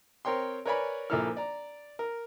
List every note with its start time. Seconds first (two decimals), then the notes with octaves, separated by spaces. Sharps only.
0.25 C4 A#4 C#5 G5 C6
0.66 A#4 B4 C#5 D5 G#5 B5
1.10 A#1 F3 A#3 E4 A4 F6
1.37 D5 A#5
1.99 A#4